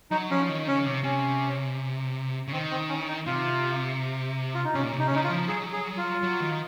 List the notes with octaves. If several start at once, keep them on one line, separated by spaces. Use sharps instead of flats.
F#3 D#4
F3 C#4
D#3
C#3 C#4
C3
C3 C#4
C#3
D#3 C4
C4
C#4
D#4
C3 F4
F4
D#4
C3 C#4
A#2
C3
D#4
C#4
C#3 D#4
F4
F3
F#3 G#4
G#4
F4
F#3
D#3